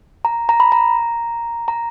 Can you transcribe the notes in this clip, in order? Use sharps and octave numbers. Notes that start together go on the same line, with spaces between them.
A#5
A#5
B5
A#5
A#5